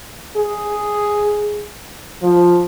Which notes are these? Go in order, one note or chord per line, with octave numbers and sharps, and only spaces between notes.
G#4
F3